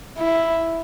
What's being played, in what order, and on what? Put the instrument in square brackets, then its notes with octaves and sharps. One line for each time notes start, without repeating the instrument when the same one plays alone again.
[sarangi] E4